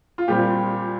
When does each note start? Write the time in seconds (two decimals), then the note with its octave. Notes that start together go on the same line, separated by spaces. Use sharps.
0.18 F4
0.28 A#2 G3 C4 G4